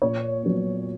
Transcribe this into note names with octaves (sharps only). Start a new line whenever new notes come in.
A#2 C#5
F#3 B3